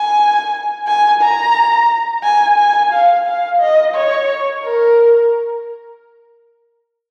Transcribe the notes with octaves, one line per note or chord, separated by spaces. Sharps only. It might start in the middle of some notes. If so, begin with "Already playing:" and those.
Already playing: G#5
G#5
A#5
G#5
G#5
F5
F5
D#5
C#5
A#4